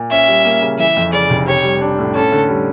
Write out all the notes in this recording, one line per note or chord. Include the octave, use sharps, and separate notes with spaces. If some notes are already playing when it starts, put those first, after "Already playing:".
Already playing: A#2
C#4 E5
G3
A#3
C#3
E3 E5
F2
C#3 D5
F1
G4 C#5
G3
D4
A2
C#4 A4
D3
G3